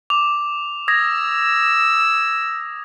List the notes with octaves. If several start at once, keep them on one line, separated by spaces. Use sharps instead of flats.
D6 F7
D#6 E6 G#6 A#6